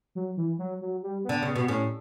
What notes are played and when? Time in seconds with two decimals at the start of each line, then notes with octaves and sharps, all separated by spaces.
0.15 F#3
0.37 E3
0.59 F#3
0.81 F#3
1.03 G3
1.24 D3 B3
1.43 C#3 B3
1.56 B2 B3
1.68 A2 C#4